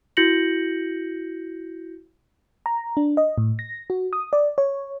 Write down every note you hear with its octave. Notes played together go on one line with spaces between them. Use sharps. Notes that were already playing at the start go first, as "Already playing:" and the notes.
E4 F#4 G6 A#6 C#7 F#7
A#5
D4
D#5
A2
A#6
F#4
D#6
D5
C#5